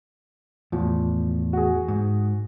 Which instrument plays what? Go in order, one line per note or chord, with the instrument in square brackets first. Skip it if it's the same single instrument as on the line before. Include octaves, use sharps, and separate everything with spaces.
[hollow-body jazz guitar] E2 A2 [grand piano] F3
[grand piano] F#4 G#4
[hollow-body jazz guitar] G#2